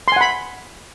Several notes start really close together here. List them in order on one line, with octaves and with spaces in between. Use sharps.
C6 G#5 F#5 B5